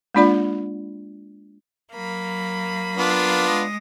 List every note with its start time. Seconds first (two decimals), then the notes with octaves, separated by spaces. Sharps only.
0.15 G#3 A#3 D4 F4 D5 B5
1.93 F#3 A#3 B5
2.97 B3 D4 F4
3.47 G#3 D#6 A#6